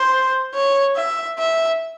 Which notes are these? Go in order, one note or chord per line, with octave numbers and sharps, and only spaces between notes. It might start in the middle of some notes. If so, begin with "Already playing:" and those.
Already playing: C5
C#5
E5
E5